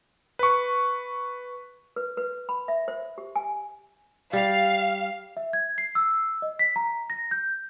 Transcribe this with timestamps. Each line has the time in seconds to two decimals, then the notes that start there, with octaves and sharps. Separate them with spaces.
0.39 B4 C#6
1.96 B4
2.17 B4
2.49 B5
2.68 E5
2.88 C5
3.18 G4
3.36 G#5
4.33 G3 F5
5.37 E5
5.53 G#6
5.78 C7
5.95 E6
6.42 D#5
6.59 B6
6.76 A#5
7.10 A#6
7.31 G6